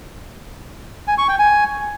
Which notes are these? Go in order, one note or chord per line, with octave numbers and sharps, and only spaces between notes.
G#5
C#6
G5
G#5